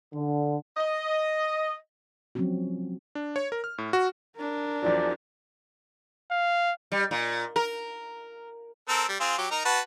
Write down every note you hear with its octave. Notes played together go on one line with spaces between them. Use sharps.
D3
D#5
F3 F#3 G#3 C4 C#4 F#4
D4
C#5
A#4
F6
A2
F#4
D4 A#4
E2 F3 F#3 D5
F5
G3
A#2
A#4
C4 A4 A#4
G3
C4 F4 G#4
F#3 G4
D#4 A#4
F#4 B4 A5